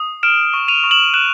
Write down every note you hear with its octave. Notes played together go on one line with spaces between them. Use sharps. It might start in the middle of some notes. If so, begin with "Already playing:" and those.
Already playing: D#6
F6 D7 E7
C#6
D#7 F7
C#6
E7 F#7
F#6 E7 F#7